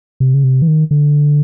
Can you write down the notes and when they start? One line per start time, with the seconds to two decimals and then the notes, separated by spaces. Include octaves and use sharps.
0.20 C3
0.34 C#3
0.44 C3
0.62 E3
0.68 D#3
0.91 D3